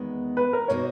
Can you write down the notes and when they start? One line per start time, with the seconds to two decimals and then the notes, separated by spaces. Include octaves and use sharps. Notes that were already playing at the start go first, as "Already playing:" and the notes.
Already playing: E2 D#3 G#3 B3
0.37 B4
0.53 A#4
0.68 B2 A#3 D#4 F#4 C#5